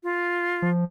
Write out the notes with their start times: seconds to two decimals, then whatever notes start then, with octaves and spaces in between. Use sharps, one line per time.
0.03 F4
0.62 F3